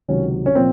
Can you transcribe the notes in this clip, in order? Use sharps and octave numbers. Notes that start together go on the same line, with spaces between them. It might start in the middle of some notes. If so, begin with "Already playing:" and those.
C#2 C3 D#3 F#3 C#4
C#4
A#2 F3 C4